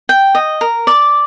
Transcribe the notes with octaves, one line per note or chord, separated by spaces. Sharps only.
G5
D#5
A#4
D5